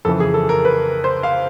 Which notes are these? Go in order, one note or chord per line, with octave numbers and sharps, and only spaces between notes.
F2 C#3 E3 A4
G#4
A4
A#4
B4
C5
F5